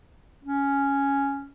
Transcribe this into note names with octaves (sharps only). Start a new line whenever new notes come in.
C#4